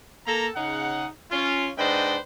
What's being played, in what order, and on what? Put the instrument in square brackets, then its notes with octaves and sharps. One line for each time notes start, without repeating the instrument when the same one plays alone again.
[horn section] A#3 A4 A#5
C#3 D#4 F#5
C#4 F4
G#2 D4 B4 C5 D#5 G5